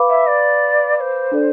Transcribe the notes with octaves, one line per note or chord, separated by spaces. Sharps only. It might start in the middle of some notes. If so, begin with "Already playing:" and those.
Already playing: B4 F5 B5 D6
E5
D5
D5
C5
D4 A4 D5